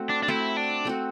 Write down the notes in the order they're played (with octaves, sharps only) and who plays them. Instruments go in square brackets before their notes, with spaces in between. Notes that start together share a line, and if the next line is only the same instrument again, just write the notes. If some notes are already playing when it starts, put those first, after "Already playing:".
Already playing: [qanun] A3 C4 F#4
[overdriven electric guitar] D4
D4
[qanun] A3 C4 F#4 [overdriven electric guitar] E4
[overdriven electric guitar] D4
[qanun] A3 C4 F#4